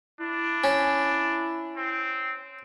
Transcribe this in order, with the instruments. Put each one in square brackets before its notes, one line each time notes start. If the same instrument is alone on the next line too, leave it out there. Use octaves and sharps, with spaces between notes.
[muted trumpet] D4 [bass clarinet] E4
[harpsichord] C#4
[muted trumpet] C4